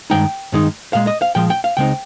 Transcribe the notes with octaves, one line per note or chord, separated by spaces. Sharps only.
G2 D#3 G#3 D#4 G5
G2 D#3 G#3 D#4
A#2 F3 G#3 F5
D#5
F5
A#2 F3 G#3 G5
G5
F5
C#2 C#3 G#3 C4 D#4 G5